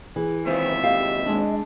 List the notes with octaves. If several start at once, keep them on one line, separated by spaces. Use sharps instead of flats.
E3 G#4
D#2 C3 F4 C5 E5
G4 D#5 F5
G#3 D4